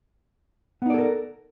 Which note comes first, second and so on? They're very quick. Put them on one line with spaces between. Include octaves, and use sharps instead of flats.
B3 D#4 D5 A4 A#4